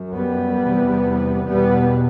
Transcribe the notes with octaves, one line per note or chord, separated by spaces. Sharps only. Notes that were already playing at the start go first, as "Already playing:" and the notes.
Already playing: F#2
G3 B3
E2 C3
E2 B2 G3 B3